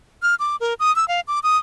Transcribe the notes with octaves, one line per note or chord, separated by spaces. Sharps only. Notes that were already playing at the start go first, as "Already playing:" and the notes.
F6
D6
A#4
D#6
E6
F5
D6
D#6